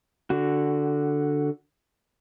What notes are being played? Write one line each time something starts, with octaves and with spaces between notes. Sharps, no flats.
D3 F#4